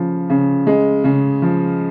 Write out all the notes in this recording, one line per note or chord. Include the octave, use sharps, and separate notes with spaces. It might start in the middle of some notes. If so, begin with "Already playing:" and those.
Already playing: C#3 F3
C#3
G#3
C#3
F3